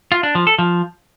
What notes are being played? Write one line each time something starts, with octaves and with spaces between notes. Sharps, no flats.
F4
D4
F3
A4
F3